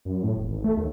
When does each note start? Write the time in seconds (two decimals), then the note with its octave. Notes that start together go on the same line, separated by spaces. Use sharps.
0.05 F#2
0.23 A2
0.37 E1
0.49 G#1
0.64 A3
0.77 D#2